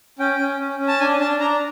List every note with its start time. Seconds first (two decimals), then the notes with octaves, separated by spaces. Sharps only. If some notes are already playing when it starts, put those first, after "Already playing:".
0.19 C#4 G5
0.39 C#4
0.60 C#4
0.79 C#4
0.88 A5
1.00 D4 G#5
1.19 D4 A5
1.40 D4 A#5